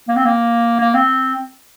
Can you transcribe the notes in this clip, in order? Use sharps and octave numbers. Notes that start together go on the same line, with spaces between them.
A#3
C4
A#3
A#3
C4